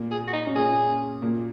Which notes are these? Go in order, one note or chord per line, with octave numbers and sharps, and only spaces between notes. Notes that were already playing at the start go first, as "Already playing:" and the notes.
Already playing: A#2 A#3
G#4
F#4
D#4
C#4
A#2 A#3 G#4
A#2 A#3